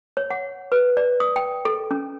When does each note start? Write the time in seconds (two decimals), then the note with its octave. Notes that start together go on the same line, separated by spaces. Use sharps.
0.17 C#5
0.30 F#5
0.72 B4
0.97 D5
1.20 D#6
1.36 G5
1.65 A4
1.91 C#4